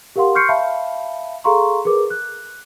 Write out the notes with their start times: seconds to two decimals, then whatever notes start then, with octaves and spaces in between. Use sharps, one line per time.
0.16 G4 A#4 F5 F#5 C6
0.35 C6 C#6 F6 G6 C7 C#7
0.49 E5 F5 A5 B5
1.44 G#4 A4 F5 A#5 C6 C#6
1.85 G#4 A#4 B4 D6
2.10 F#6